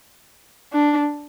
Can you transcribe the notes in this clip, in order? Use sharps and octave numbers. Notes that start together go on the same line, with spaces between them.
D4